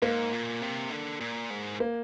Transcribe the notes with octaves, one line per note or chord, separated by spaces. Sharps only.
G#2 A#3
A#2
C3
D3
A#2
G#2
A#3